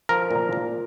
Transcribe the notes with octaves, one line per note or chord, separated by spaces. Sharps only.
F3 A#4
A#2
A#2